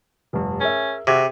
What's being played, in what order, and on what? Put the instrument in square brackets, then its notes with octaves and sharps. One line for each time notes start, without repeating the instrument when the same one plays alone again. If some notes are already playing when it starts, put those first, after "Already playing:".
[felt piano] F1 G2
[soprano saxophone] C#4 [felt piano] G#4 A#4 E5
[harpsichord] C3 [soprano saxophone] F#4 [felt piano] G#4 E6 G#6